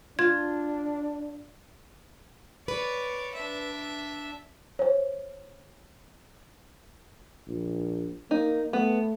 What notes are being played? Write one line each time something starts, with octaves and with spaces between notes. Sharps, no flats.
D4 F4 G#6
B4 C#5 D5
D4 E5
C5 C#5
A#1
A#3 D#4
A3 B3